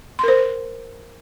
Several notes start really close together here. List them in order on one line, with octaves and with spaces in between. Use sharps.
C6 A#4 C5